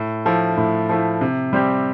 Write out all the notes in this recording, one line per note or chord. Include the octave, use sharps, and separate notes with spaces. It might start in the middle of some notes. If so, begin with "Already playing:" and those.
Already playing: A2
F3 A3 E4
A2
F3 A3 E4
C3
G3 C4 G4